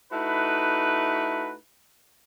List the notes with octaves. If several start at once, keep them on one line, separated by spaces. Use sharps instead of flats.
A3 D#4 E4 F#4 B4